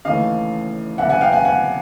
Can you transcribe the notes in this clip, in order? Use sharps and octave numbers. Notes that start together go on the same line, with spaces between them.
D#2 C#3 E3 A3 D#5 F5
F#1 E2 B2 E5 F#5
F#5 G#5
F5 G5
F#5 G#5
F#5 G#5